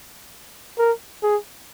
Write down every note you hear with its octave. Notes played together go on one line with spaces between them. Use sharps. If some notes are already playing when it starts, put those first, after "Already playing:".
A#4
G#4